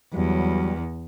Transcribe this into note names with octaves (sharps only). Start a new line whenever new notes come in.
E2 F#3 G3